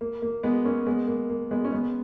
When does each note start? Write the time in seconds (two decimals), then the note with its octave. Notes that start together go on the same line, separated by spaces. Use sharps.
0.01 A#3
0.22 A#3
0.43 G#3 B3
0.65 A#3 C#4
0.86 G#3 B3
1.08 A#3
1.29 A#3
1.51 G#3 B3
1.65 C#4
1.72 G#3 B3